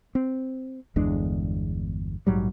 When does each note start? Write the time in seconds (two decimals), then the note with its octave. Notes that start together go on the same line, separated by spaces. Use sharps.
0.15 C4
0.96 G1 E2 G#3 D4
2.27 A#1 G#2 F#3 G3